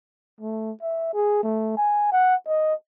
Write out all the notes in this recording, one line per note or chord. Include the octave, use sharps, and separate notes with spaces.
A3
E5
G#4
A3
G#5
F#5
D#5